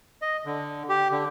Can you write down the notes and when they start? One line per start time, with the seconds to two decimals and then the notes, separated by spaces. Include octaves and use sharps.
0.22 D#5
0.45 D3
0.89 G4
1.11 D3